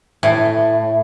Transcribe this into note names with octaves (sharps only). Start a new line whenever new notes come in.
A2